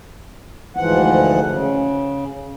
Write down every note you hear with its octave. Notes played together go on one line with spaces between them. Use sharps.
D2 G#2 E3 F3 F#5
C#3